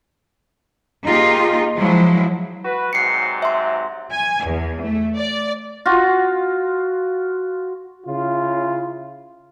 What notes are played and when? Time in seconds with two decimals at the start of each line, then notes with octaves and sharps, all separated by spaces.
1.06 A#3 D#4 F4 G4 G#4
1.77 F3 F#3 G#3 E4
2.63 F#4 B4
2.93 G#2 C3 F#3 C7 C#7
3.42 E5 C6
4.13 G#5
4.47 E2
4.82 A3
5.18 D5
5.86 F4 F#4
8.07 C#3 E4 F4